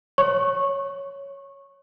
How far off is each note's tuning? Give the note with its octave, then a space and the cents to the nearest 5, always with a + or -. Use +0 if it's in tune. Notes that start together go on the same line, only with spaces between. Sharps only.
C#5 +0 C#6 -20